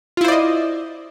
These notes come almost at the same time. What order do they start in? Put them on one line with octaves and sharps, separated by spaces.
F4 E4 C5 D5 D#5